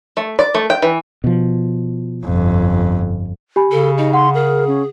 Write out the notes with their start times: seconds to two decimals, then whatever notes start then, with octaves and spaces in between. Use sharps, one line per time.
0.17 A3
0.39 D5
0.55 A3
0.70 G5
0.82 E3
1.24 B2 F3
2.23 G1 F2
3.56 G4 G#5 B5
3.71 C#3 A4
3.98 D#4 D#5
4.14 F#5 C6
4.35 G#4 A#4
4.68 C#4